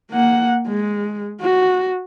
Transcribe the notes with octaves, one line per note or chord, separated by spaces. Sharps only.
A#3 F#5
G#3
F#4